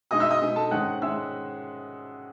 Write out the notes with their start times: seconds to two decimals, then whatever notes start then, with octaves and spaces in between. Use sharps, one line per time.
0.11 B2 G#3 D#4 D#5 D#6
0.20 E5 E6
0.31 D#5 D#6
0.42 B2 G#3 D#4
0.56 A4 A5
0.71 G#2 D#3 G#3 C#4 F#5 F#6
1.02 D#3 G#3 C#4 E5 E6